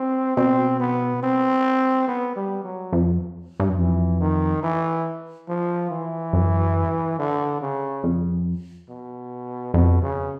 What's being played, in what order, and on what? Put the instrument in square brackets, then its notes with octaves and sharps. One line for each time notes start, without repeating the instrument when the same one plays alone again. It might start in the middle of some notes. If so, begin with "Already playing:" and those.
Already playing: [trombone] C4
[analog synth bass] B2 [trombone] C4
[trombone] B3
C4
B3
G3
F#3
[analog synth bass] F2
G2
F#2
[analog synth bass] F2 [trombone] E3
[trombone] D#3
E3
F3
E3
[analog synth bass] F#2
[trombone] D3
C#3
[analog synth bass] F2
[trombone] B2
[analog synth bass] F2 [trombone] B2
[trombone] C#3